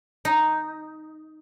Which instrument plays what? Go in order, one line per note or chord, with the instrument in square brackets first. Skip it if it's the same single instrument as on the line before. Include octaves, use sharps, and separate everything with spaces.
[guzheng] D#4